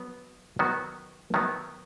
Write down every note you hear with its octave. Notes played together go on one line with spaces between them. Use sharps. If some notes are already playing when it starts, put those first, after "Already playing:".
Already playing: F#3 B3 F#4
D#3 F#3 B3 F#4
D#3 F#3 B3 F#4